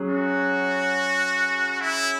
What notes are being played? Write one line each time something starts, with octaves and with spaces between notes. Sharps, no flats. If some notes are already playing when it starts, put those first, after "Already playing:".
Already playing: F#3 C#4 G#4
F#4
E4